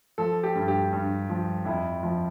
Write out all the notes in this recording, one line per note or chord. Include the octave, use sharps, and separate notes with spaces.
F3 A4
G4
G2
G4
G2
F3
F2 E4
F3